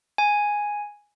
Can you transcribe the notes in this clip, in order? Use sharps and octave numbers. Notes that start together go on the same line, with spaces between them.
G#5